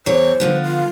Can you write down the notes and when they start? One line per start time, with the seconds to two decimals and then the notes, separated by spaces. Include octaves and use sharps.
0.06 E2 C5 C#5
0.40 D3 F3 B3
0.63 F4